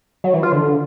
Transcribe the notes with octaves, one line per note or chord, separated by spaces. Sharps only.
F#3
E3
F4
D3